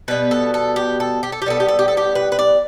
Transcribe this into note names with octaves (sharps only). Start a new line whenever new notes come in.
B2 G3 B3 B4
A4
A4
G4
A4
G4
A4
G4
A2 G3 B3 A4
G4
A4
G4
A4
G4
B4
B4
D5